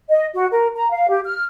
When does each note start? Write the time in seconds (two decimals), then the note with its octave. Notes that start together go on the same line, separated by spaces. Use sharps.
0.09 D#5
0.34 F#4
0.52 A#4
0.75 A#5
0.91 F5
1.09 G4
1.25 F6